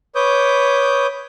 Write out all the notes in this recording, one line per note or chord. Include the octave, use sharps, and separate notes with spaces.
B4 C#5 D6 D#6 G6